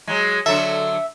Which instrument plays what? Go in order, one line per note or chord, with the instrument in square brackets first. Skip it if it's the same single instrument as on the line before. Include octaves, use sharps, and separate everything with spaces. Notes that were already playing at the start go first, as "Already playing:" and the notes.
[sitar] F#3 G#3
[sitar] D3 F#3 A4 [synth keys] E5